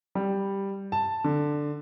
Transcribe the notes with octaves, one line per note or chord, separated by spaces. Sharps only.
G3
A5
D3